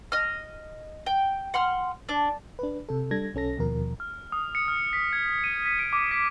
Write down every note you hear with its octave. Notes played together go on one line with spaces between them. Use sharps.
D#5 F6
G5
F#5 C6 F6
D4
D4 B4
C3 A4
G3 D4 A4 G#6 A#6
B1 C#4 A4 A#6
D#2 B2 F3 A#4
F6
D#6
C#7
F6
B6
G#6
D#7
B6
D7
D6
B6